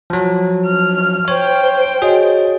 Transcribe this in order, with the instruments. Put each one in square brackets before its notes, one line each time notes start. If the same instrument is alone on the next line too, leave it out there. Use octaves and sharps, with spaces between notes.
[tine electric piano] F3 F#3 [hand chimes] A5
[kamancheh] F6
[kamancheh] C5 G5 [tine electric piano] C#5
[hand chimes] F#4 C#5 D#5 [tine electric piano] G#4